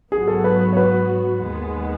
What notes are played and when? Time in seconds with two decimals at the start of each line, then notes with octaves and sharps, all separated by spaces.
0.12 G#2 F#3 B3 F#4 G#4
0.28 A4
0.44 B4
0.73 C#5
0.77 B4
1.41 D#2 D#3 G#3 B3